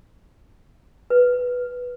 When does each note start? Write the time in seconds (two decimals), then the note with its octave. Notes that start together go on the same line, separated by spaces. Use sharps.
1.10 B4